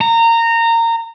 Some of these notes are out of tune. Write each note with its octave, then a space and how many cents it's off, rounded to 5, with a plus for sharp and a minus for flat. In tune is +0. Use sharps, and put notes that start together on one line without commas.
A#5 -20